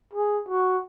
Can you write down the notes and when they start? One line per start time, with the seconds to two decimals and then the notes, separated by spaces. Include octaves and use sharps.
0.13 G#4
0.48 F#4